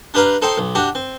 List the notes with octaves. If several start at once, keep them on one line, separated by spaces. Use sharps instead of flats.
D4 G4 B4 F5 A#5
D#4 A4 C5 G5 C6
B1
D4 F#4 G4
C4